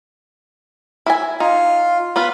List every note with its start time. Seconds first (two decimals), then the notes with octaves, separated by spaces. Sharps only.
1.06 E4 E5 G#5
1.40 D#4 F4
2.16 B3 F4 F5 B5